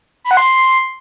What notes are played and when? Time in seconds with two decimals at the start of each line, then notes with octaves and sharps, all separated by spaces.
0.24 B5
0.31 F#5
0.37 C6